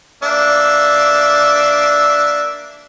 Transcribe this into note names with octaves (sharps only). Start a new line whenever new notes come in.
A#3 D4 E5